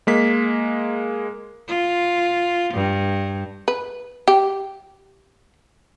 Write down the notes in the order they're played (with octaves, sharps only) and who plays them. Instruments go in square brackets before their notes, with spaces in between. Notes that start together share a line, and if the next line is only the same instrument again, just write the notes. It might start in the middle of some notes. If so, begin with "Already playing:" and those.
[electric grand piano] G#3 A#3 B6
[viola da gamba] F4
G2
[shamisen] B4
G4